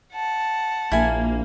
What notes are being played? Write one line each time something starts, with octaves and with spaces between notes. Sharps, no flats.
F#5 A5
A#1 A#3 E4 G#5